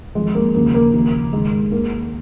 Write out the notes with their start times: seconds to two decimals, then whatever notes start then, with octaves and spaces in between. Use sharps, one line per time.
0.15 F2 D#3 G#3
0.35 A#3
0.55 D#2 C#3 F3 A#3
0.74 A#3
0.93 D#2 C#3 F3
1.33 G#2 D#3 G#3
1.72 D#2 D#3 A#3